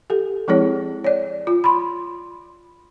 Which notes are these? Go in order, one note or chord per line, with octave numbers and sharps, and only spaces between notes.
G4 A4
F3 G#3 C4 E4 G#4 C#5
C#5 D5
F4
B5 C6